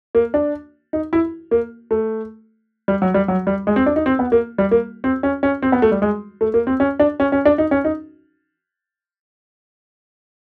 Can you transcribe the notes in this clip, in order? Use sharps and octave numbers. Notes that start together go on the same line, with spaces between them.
A#3
D4
D#4
E4
A#3
A3
G3
F#3
G3
F#3
G3
G#3
C4
D4
D#4
C4
B3
A#3
G3
A#3
C4
C#4
C#4
C4
B3
A3
G3
G#3
A3
A#3
C4
C#4
D4
C#4
C#4
D4
D#4
C#4
D#4